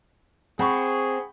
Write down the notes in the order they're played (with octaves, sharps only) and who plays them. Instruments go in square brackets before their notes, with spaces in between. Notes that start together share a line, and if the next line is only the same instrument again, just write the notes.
[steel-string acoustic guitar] C4 [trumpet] G#4 [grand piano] F#5 B5 C#6